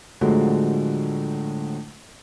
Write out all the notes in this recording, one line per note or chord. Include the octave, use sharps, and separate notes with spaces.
A2 D3 F3 F#3 G#3 A3